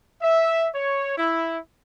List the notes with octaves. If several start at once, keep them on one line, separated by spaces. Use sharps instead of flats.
E5
C#5
E4